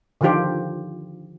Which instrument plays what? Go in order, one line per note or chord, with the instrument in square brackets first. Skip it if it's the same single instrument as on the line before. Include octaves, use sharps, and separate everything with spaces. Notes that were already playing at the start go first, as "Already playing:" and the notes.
[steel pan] D3 D#3 F3 F4 G4 C5